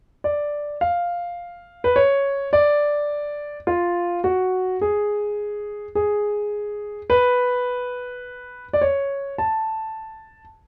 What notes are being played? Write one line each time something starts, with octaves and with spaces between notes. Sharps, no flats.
D5
F5
B4
C#5
D5
F4
F#4
G#4
G#4
B4
D5
C#5
A5